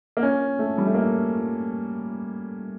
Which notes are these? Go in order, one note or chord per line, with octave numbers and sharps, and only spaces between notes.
A#3
C#4
A3
G3
A3
A#3